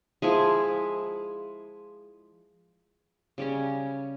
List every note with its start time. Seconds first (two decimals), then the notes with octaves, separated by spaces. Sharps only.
0.22 F3 G#3 E4 G#4
3.38 C#3 G3 C#4